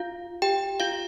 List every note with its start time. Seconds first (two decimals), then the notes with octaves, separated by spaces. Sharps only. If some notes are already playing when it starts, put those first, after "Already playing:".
Already playing: F4 F5
0.42 G4 G5
0.80 F4 F5